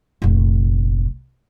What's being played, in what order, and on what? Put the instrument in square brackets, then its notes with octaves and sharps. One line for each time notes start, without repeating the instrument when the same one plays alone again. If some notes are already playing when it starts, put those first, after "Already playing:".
[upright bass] F1 A#1